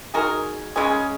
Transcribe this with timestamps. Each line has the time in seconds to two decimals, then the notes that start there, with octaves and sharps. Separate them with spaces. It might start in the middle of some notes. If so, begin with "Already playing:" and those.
0.14 G#3 D#4 F#4 G#4 A#4
0.76 C#3 G#3 C#4 G#4